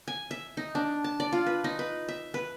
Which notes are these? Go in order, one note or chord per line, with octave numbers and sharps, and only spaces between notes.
G#5
E5
D#4
D4
A5
D5
F4
B4
D#4
B4
E5
B4